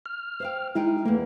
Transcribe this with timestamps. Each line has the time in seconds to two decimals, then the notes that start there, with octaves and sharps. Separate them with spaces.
0.06 F6
0.40 C5 F5 G5
0.75 G#3 D#4 E4 G5
1.06 E2 A3 A#3